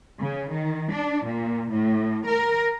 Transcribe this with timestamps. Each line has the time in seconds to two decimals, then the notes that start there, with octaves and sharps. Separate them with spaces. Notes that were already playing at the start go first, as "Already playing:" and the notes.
0.20 C#3
0.51 D#3
0.92 D4
1.24 A#2
1.72 A2
2.27 A#4